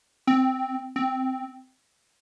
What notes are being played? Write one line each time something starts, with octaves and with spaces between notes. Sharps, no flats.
C4
C4